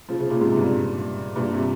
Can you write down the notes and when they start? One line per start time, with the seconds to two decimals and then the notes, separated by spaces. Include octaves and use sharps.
0.09 C#3 F3
0.19 C#3 F3
0.30 A#2 C#3
0.41 G#2 C3
0.56 G2 A#2
1.36 G2 A#2
1.52 C3